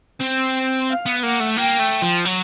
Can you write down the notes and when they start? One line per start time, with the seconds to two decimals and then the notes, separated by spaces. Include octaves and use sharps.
0.21 C4
0.89 F5
1.06 B3
1.23 A#3 F#5
1.40 A3
1.57 A#3 G5
1.80 A3
2.02 F3
2.25 F#3